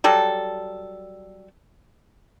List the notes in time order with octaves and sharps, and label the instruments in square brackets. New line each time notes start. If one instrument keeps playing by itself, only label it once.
[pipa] F#3 G3 A4